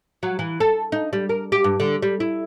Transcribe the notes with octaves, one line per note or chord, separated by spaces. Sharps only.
F#3
E3
A4
D#4
G3
A#4
G4
G2
D3
G3
E4